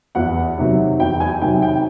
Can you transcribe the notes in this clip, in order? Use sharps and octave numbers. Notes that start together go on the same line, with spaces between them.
E2 F#5
C3 D#3 F#3
E2 G5
G#5
C3 D#3 F#3 G5
G5